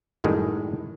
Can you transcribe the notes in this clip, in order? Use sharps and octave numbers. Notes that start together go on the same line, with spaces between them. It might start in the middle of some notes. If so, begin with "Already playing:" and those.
F#2 A2 D#3 G3 G#3